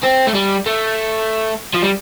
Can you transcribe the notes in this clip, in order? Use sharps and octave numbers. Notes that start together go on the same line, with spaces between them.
C4
A3
G3
A3
F3
G3